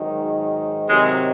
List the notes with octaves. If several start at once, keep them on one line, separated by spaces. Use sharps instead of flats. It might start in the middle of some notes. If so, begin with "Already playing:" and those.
Already playing: G#2 D#3 F#3
C3 D#3 F#3 G#3